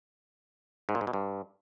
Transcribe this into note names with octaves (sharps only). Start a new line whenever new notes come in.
G#2
A#2
G#2
B2
G2